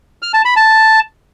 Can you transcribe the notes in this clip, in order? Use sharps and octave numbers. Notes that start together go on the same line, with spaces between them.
F6
A5
B5
A5